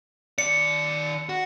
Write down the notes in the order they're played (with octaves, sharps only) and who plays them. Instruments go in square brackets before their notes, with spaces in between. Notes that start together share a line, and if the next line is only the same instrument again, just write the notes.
[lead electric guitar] D#3 D5 [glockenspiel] C#7
[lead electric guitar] F#4